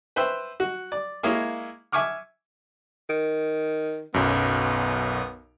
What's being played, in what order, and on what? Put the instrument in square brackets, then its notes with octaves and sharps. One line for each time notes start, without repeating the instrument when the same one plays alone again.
[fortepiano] B4 C5 E5 G5 E6
F#4
D5
G#3 A#3 E4 C#5 D#5 F5
E5 G#5 C#6 D6 F6
[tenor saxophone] D#3
[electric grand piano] B1 F#2 [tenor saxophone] B3